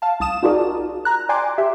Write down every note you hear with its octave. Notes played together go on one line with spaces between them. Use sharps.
F5 A5
C2 A5 D#6 E7
D#4 F4 F#4 G#4 A#4 D5
A#5 F#6
D5 G5 G#5 C6 D6
G4 E5